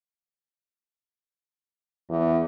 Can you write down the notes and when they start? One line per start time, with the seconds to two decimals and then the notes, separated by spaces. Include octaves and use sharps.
2.10 E2